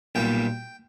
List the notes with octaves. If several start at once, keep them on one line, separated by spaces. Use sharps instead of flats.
B1 A#2 G3 G5